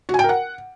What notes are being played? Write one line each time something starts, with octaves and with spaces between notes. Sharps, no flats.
F#4
G#5
G5
A#4
F#5